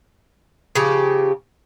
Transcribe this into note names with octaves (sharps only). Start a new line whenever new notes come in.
C#3 F3 G4